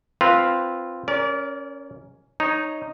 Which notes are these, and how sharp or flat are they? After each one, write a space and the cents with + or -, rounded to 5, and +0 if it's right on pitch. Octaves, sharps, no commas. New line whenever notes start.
C4 +0 F4 +0 B4 -10
C#4 +0 A#4 +0 D5 -35
D#4 -5 C#5 +0